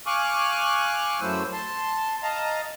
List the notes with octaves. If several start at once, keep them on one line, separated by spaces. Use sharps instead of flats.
F5 G#5 C#6 D6 F6 F#6
F#2 F#3 A3 E4 C5 E6
A5 C6
D#5 F5 A5 A#5